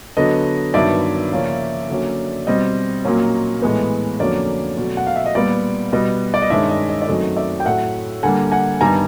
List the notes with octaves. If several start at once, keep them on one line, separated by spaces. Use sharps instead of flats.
D3 F#3 B3 D#5
G2 D#3 F#3 B3 D5 E5
C#3 F3 A#3 C#4
D3 F#3 A#3 C#4
B2 G3 C4 D#5
A#2 F#3 A#3 C#4
A2 E3 G#3 B3
F2 D3 F#3 A#3 C#4 D5
B2 F#3 A3 C#4
F#5
F5
E5
D#5
A#2 G3 B3 D5
B2 G3 B3 D#5
D5
D#5
G2 D#3 G#3 C#4 D5 E5
D#5
D#5
D5
F#2 D#3 F#3 A3 C4 D#5
D5 E5
G5
A2 F#3 A3 E5 F#5
D3 G3 A#3 F#5 G#5
F#5 G#5
G2 D#3 G3 B3 G#5 A#5